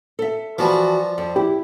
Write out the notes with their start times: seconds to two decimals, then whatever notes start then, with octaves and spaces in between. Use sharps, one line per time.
0.19 A4 E5
0.58 E3 F3 G3 F#4 A5
1.18 F2
1.36 E4 G4